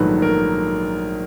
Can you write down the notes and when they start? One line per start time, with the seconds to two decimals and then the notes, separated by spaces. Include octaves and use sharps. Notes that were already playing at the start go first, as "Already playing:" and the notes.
Already playing: A#1 G#2 D#3 F#3 A3 B4
0.22 A#4